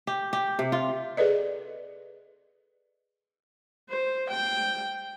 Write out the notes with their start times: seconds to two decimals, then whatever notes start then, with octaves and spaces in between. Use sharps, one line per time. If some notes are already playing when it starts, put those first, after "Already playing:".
0.07 G4
0.33 G4
0.59 C3
0.72 F4
1.17 G#4 A4 B4 D5 D#5
3.89 C5
4.30 G5